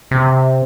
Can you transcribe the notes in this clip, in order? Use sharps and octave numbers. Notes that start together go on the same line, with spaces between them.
C3